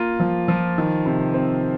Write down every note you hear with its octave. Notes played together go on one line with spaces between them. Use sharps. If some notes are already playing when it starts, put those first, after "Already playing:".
Already playing: A#3 F4
F3
F3
D#3
C3
C4